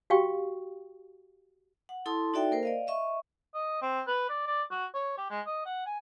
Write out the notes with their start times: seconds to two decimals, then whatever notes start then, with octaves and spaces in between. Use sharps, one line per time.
0.10 F#4 G4 F5 G5 C#6
1.89 F#5
2.06 E4 A4 A5 C6 D#6
2.34 D#4 F#4 A4 D5 E5 G5
2.51 A#3 A#4 C5
2.63 D5 D#5 F5
2.87 D#5 E5 C#6
3.54 D#5
3.82 C4
4.07 B4
4.29 D5
4.47 D5
4.71 F#4
4.94 C#5
5.18 G4
5.30 G#3
5.46 D#5
5.66 F#5
5.86 G#5